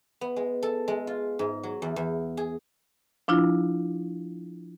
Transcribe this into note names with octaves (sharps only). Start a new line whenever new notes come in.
B3
G#3
A4
G#3
F4
G#2
F#3
E2
E2
G#4
F3 D4 E4 F4